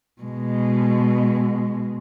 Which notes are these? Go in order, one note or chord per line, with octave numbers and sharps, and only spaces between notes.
B2 G#3